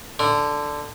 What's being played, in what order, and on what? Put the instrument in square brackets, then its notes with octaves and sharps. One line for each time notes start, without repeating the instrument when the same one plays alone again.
[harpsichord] D3